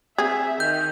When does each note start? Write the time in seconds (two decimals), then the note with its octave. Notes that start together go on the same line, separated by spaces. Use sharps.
0.18 C4 G#4 E5
0.60 D#3 G6